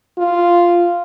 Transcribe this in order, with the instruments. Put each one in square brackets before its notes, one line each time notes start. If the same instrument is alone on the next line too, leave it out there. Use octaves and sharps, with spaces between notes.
[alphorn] F4